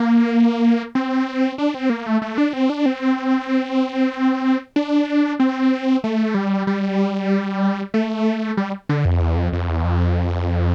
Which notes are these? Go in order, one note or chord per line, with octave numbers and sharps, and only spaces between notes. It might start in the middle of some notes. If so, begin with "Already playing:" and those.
Already playing: A#3
C4
D4
C4
A#3
A3
A3
D4
C4
D4
C4
D4
C4
A3
G3
G3
A3
G3
D3
F2
E2
F2
F2
E2
F2